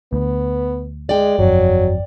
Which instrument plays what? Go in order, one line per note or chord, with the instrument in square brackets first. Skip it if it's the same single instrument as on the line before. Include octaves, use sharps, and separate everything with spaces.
[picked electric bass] D2 [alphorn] B3
[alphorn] G#3 [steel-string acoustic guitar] D5 G5
[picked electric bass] G1 F2 [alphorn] F#3